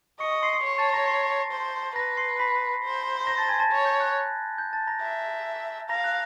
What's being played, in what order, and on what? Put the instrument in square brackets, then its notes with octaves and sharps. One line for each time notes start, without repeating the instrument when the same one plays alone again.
[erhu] D#5 [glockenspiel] C#6 C#7
[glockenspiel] C#6 C#7
C6 C7
C6 C7
[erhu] C#5
[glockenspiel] A5 A6
A#5 A#6
C6 C7
[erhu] C5
[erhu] B4 [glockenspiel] A#5 A#6
[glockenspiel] C6 C7
B5 B6
[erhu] C5
[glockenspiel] A#5 A#6
A5 A6
G#5 G#6
A5 A6
[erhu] C#5
[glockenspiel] G6
F#6
G6
A5 A6
A#5 A#6
[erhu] E5
[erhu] F5 [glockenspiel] A#5 A#6
[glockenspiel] F#6